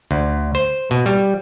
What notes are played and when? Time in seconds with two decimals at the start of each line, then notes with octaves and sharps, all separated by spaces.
0.11 D2
0.55 C5
0.91 B2
1.06 G3